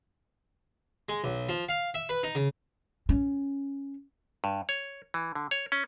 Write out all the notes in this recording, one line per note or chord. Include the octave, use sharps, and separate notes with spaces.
G#3
B1
F3
F5
E5
B4
D#4
C#3
C#4
G2
C#5
E3
D3
C#5
C#4